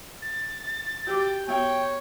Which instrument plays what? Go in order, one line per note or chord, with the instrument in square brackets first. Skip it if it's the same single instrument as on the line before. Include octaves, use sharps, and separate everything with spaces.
[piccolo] A6
[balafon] F#4 G4 D6 [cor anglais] G5
[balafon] B3 F#4 E5 [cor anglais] C#5 [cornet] G5